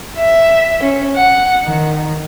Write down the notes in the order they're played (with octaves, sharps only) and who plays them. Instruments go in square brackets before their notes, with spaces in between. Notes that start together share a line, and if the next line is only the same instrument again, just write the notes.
[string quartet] E5
C#4
F#5
D#3